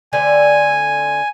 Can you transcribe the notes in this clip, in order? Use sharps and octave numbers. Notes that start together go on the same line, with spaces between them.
D3 A3 C4 G#5